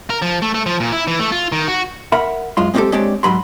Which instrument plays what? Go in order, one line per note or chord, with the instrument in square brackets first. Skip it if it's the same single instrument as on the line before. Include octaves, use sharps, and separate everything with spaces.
[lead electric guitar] A#4
F3
A3
A3
F3
A#2
E4
E3
A3
F4
D#3
F#4
[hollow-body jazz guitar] A#4 E5 F#5 B5
F#2 G#3 F4 C6
G#3 C4 D4 F#4 G4 A4
G#3 C4 D4 G4 C#5 D5
G#2 F#3 B5 C6